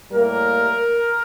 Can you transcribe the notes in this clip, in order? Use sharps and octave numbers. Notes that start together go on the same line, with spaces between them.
A2 G3 A#3 A#4